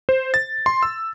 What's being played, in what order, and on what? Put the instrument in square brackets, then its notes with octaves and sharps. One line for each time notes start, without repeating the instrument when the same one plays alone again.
[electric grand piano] C5
A6
C6
E6